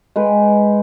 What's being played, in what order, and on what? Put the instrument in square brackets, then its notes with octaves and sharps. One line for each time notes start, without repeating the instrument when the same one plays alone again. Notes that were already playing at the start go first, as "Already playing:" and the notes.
[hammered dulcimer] G#3 B4 G5